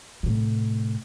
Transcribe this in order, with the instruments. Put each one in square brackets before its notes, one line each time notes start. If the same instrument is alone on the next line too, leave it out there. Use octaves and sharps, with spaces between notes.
[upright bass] A2 C3